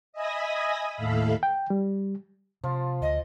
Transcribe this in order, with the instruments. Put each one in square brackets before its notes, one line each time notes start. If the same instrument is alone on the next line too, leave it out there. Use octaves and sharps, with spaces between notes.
[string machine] D#5 E5 G#5 B5 D#6 A#6
D#2 A2 A4 E5 F5 B5
[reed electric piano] G5
G3
[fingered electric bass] C3 [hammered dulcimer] F3 F4
[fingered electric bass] D2 [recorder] D#5